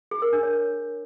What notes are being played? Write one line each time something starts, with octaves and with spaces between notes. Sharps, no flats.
G#4
A#4
D4
C#5